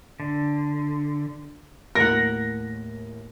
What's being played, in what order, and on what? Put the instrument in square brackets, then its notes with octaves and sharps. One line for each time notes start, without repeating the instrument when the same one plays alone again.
[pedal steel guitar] D3
[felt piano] D#2 A2 [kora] A#4 F#5 [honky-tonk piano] A#6